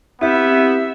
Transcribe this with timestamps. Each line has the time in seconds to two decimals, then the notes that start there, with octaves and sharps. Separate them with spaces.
0.21 B3 C4 E4 G4 E5